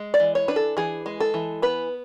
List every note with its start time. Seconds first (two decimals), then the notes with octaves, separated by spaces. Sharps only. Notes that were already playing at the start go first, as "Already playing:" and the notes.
Already playing: G#3
0.14 D5
0.20 E3
0.35 C#5
0.48 D4 B4
0.56 A4
0.77 E3 G#4
1.06 G#3
1.20 A4
1.34 E3
1.62 B3 B4